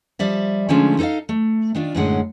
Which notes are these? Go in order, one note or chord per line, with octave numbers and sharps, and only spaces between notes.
F3 G3 D5 E5
D3 F3 G#3 A3 C#4 D4
D#4 A4 C#5 D#5 F5
A3
D#3 D4 F4
F#2 A2 D3 F#3 G#3 F#5